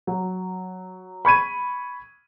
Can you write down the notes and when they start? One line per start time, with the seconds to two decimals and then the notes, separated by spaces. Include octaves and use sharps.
0.07 F#3
1.25 B5 C#6 G#6 D#7